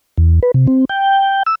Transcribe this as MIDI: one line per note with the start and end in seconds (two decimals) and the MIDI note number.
0.18 0.40 40
0.43 0.51 71
0.54 0.67 48
0.67 0.85 60
0.89 1.43 79
1.46 1.55 88